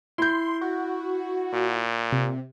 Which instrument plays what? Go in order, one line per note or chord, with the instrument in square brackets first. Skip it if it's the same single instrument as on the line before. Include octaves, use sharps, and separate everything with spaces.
[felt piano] E4 G6 [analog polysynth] C6
[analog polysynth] F#4
[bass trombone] A#2
[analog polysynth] C3